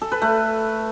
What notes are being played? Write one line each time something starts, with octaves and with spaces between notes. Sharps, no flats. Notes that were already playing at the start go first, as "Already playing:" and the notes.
A4
B4
A3